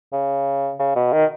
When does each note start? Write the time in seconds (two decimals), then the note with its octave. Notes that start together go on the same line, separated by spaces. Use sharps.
0.13 C#3
0.79 C#3
0.95 B2
1.13 D#3